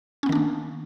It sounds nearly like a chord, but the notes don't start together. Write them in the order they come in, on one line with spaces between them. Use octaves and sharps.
C#4 B3 D#3 D4 A#3